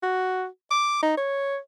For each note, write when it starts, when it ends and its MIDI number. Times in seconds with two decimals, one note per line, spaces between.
0.03 0.46 66
0.71 0.99 86
1.03 1.13 63
1.17 1.58 73